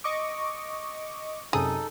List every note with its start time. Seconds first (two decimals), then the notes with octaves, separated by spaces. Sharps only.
0.04 D#5 C#6 D6
1.53 F#2 C3 D#4 G#4 A4 D#6